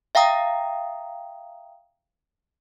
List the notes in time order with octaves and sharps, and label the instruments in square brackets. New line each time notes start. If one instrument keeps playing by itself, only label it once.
[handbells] E5 F5 G5 A#5 D#6